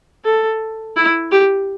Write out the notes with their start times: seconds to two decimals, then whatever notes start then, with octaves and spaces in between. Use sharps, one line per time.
0.25 A4
0.96 E4
1.31 G4